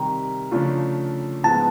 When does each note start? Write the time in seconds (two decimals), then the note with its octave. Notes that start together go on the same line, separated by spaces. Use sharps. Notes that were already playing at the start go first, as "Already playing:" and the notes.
Already playing: C3 D#3 G3 A#5
0.51 C#3 F3 A3 D4 F4
1.44 G#2 F3 G#3 B3 A5